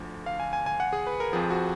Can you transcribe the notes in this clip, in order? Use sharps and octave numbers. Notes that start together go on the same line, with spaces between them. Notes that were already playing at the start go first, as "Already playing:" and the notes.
Already playing: D2 D3 F3
F5
G#5
G#5
G#5
F#5
G#4
B4
A#4
F2 F3 G#4
F#4